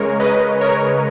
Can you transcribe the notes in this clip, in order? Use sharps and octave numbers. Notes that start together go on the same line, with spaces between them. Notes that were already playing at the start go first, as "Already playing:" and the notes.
Already playing: C#3 G#3 A#4 C#5
B4 D#5
A#4 C#5